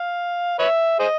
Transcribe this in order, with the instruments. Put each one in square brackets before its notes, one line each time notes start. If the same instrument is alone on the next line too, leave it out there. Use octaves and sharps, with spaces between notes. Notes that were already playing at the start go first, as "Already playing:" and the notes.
Already playing: [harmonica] F5
B4 C#5 E5
G#4 C5 D#5